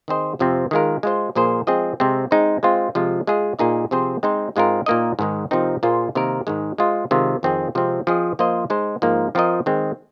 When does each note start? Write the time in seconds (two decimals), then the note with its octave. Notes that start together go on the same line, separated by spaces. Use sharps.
0.08 D#3 C4 G#4 C5 D#5
0.39 F2 C3 F3 C4
0.71 D#3 G#3 F4 A#4
1.03 G#3 F4 C5 D#5
1.35 A#2 F3 A#3 G#4 C5
1.67 F3 G#3 C4 G#4 D#5
2.00 C3 G#3 C4
2.31 G#3 C4 D#4 C5
2.63 G#3 C4 F4 C5
2.95 C3 F3 G#3 F4
3.27 G#3 F4 G#4 D#5
3.59 A#2 A#3 D#4 G#4 D#5
3.91 C3 F3 C4 G#4 C5
4.23 G#3 C4 D#4 C5
4.56 G#2 G#3 C4 F4 A#4
4.86 A#2 A#3 D#4 A#4 D#5
5.19 G#2 D#3 G#3 D#4
5.51 C3 F3 C4 D#4 A#4
5.83 A#2 A#3 F4 G#4 C5
6.15 C3 D#3 A#3 D#4 A#4
6.47 G#2 D#3 G#3
6.78 G#3 F4 C5 D#5
7.11 C3 D#3 G#3 F4
7.43 F2 D#3 C4 G#4
7.75 C3 F3 G#3 C4
8.07 F3 C4 G#4 D#5
8.39 F3 A#3 F4 C5 D#5
8.70 G#3 D#4 C5 D#5
9.02 G#2 F3 A#3 D#4
9.35 F3 C4 F4 A#4 D#5
9.66 D#3 G#3 C4